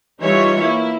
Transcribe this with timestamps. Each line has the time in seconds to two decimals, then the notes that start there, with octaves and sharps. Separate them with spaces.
0.21 E3 G3 D#4 F4 C#5 E5
0.60 A#3 E4